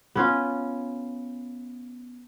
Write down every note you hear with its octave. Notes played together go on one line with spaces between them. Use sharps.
B3 C#4 F4